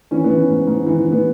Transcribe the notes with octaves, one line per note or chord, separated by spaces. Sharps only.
E3 C#4
B3
E3
C#4
G#2
G#2
E3
E3
B3